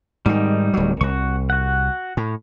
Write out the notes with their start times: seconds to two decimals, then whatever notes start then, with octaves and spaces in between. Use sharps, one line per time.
0.26 G#2 D#3 G3 D#4
0.73 D1 F#3
1.01 C2 F#4 C#6
1.50 F#4 F#5
2.17 A2